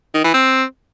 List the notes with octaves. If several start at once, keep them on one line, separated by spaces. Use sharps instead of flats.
D#3
E3
C4